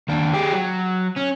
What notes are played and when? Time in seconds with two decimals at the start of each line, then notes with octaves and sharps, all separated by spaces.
0.08 D#2 D4
0.33 G#3 G4
0.52 F#3
1.16 C#4